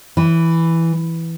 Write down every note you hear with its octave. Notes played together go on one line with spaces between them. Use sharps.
E3